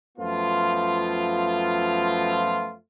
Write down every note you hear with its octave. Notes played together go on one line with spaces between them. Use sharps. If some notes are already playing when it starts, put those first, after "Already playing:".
F#2 F3 A3 B3 F4